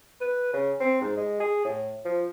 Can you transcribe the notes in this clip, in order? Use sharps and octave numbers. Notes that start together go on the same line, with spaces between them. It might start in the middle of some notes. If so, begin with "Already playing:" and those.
B4
C#3
C4
G#2
G#3
G#4
A2
F3